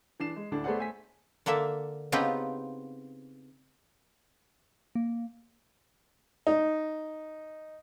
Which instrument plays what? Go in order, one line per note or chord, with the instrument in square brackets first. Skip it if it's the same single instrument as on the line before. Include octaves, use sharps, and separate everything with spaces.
[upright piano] E3 D4 C7 E7
G#3
D2 A2 D4
A3 B3 G#4 C5 D5 F#5
A3 C5 G#5 B6
[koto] D3 A#3 D4 E5
C#3 B3 C4 D#4 F4 G4
[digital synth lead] A#3
[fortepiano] D#4